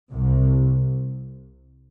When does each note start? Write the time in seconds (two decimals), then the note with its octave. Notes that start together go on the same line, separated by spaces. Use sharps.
0.12 C2 C3